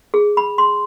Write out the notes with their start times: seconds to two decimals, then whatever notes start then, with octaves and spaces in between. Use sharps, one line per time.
0.14 G#4
0.37 B5
0.58 C6